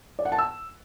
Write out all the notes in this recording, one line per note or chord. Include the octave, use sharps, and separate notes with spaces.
D5
F#5
A5
E6